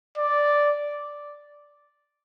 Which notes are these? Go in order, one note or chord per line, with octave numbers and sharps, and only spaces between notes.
D5